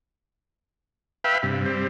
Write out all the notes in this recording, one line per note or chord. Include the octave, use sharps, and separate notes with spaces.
B4 E5 F5 G5 B5
G2 C3
G3 C4